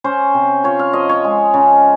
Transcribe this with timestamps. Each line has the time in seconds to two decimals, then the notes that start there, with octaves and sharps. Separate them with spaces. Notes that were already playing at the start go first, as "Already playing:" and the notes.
0.04 C#4 C5
0.34 C3
0.64 F4 C#5
0.79 F5
0.93 F3 D#5
1.09 C#5
1.24 G#3
1.54 C#3